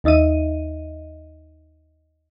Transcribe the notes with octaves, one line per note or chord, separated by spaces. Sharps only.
D#2 D#4 D#5 E5 D#7